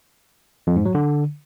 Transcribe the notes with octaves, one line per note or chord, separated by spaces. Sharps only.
F2
G#2
F#3
D3